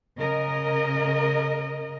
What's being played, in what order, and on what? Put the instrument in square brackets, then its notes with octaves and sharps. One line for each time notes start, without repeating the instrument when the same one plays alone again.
[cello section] C#3 A#4 D#5